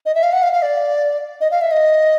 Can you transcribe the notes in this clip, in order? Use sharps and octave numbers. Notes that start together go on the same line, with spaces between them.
D#5
E5
F5
F#5
F5
F5
D5
D#5
F5
E5
D#5